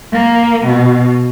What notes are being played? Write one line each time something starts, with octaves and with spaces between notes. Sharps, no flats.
A#3
B2